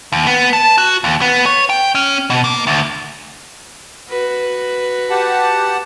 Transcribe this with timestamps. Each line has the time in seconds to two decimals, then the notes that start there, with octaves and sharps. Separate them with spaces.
0.12 D#2
0.27 B3
0.53 A5
0.78 F#4
1.04 D#2
1.21 B3
1.46 C#5
1.69 G5
1.95 C#4
2.30 B2
2.44 A#3
2.67 D2
4.09 F#4 B4
5.10 G4 F#5 A5